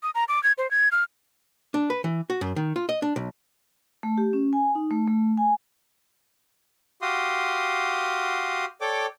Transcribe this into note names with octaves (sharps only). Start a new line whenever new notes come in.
D#6
A#5
D6
G#6
C5
G#6
F6
D4
B4
E3
F#4
F#2
D#3
F4
D#5
D4
B1
A3
G4
C#4
G#5
D#4
A3
A3
G#5
F#4 G4 F5 C6 D#6
A4 C#5 D5 G5 D6